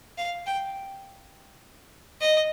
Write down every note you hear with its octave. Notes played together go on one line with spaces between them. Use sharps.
F5
G5
D#5